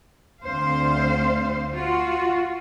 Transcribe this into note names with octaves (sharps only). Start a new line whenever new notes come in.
D2 C4 C5 F5
F4 F#4